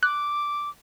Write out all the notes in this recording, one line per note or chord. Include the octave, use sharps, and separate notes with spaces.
D6 F#6